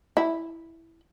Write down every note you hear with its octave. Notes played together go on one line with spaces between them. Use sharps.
E4